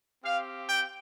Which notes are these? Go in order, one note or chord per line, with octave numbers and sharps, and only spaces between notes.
C4 G4 F5
G5